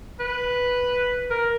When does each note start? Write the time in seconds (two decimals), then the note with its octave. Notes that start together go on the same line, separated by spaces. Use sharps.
0.20 B4
1.30 A#4